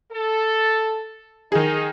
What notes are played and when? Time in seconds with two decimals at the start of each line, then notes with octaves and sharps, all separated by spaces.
0.12 A4
1.52 D#3 D#4 G#4